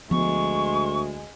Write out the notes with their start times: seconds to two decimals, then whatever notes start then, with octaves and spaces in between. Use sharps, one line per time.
0.11 D2 F3 G#3 B3 C#6